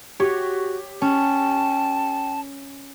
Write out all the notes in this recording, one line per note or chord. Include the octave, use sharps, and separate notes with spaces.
F#4 G4 C#5
C#4 G5 A5